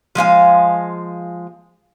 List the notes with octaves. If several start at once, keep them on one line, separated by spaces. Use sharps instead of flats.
F3 G#3 F5 G#5